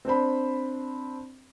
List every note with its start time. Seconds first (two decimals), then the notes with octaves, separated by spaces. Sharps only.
0.05 C4 D4 C5 B5